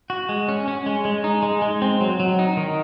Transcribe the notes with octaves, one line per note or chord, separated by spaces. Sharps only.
F#4
G#3
C#4
C#4
G#3
G#3
D#4
G#3
G#3
C4
F#3
F#3
D#4
D#3